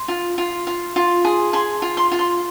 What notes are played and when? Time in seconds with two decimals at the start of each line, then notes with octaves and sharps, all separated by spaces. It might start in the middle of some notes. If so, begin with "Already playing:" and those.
Already playing: C6
0.08 F4
0.38 F4
0.67 F4
0.96 F4
1.25 G#4
1.53 G#4 C6
1.82 F4
1.97 C6
2.12 F4
2.19 C6